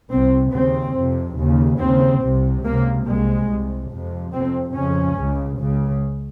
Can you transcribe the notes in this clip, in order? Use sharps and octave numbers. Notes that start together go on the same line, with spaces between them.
C2 C3 C4
D#2 C#3 C4
F2 C3
D#2 C#3
D#2 C#3 C4
C2 C3
C#2 C3 A#3
C2 C3 G#3
C2 C3
F2 C3
F2 C3 C4
F2 C#3 C#4
C#2 C#3
C#2 C#3